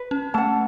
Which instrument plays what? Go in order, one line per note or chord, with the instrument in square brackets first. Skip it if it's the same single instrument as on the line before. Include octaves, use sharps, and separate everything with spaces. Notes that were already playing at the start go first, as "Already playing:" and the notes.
Already playing: [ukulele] B4
[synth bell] C#4
[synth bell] A3 [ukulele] F#5 A5